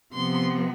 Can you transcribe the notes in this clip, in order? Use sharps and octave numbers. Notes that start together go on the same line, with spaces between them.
C3 F3 B3 C6